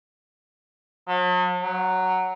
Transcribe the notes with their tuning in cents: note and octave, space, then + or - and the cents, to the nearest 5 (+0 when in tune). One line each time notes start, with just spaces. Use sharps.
F#3 -45
F#3 +5